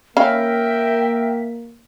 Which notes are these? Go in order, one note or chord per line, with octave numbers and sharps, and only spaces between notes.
A#3 C#4 A#4 E5 F5 G5 B5